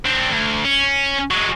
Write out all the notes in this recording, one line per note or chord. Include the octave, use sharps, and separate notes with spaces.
C4 D4
D2
C#4
F#3 G#3